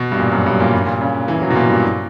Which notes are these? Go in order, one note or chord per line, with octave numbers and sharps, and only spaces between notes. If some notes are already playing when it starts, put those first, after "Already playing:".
Already playing: B2
G2
A#2
F#2
G2
A#2
G2
A#2
C#3
E3
F#3
B2
A#2
G2